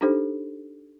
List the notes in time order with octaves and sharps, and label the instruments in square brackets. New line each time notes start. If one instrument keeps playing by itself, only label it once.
[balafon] D4 D#4 G4 A4 C5